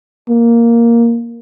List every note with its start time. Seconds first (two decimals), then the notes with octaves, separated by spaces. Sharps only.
0.29 A#3